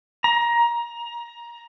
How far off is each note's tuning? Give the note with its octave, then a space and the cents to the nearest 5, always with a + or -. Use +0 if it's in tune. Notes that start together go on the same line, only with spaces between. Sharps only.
A#5 +20